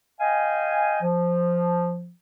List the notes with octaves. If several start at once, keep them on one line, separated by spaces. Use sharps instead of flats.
D#5 F5 G5 G#5
F3